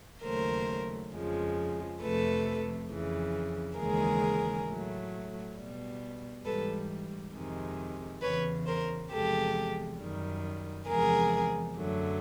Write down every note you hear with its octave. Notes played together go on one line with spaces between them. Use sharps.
D#2 C#3 F#3 A3 A#4 C5
F2 C#3 F3 G#3
F2 C3 F3 A3 A4 B4
F2 C#3 E3
D#2 C#3 E3 G#3 G#4 A#4
A2 F#3 A3
B2 G3
G#2 E3 G3 A4 B4
F2 C3 D#3 G#3
E2 C#3 E3 B4 C#5
A#4 C5
E2 C3 F3 G#3 G4 A4
F#2 D#3 G3
E2 C3 F3 G#3 G#4 A#4
F#2 D3 F#3 A3